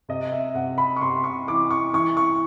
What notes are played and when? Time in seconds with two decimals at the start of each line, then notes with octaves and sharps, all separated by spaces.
0.09 C3 D#5
0.32 E5
0.55 C3 F#5
0.78 B5
0.96 C#6
1.01 C3 C6
1.24 C#6
1.48 E3 D6
1.70 C#6
1.93 E3 C#6
2.17 C#6